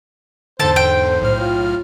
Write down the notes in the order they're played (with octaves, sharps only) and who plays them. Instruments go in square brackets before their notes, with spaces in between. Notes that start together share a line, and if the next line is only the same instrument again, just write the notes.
[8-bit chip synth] E2 G#2 D3 [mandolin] A4 A5 [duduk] C5
[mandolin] G5
[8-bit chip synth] B1 A2 F6
[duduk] F4